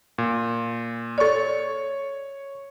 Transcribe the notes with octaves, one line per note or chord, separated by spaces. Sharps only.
A#2
A4 C#5 D5 C#6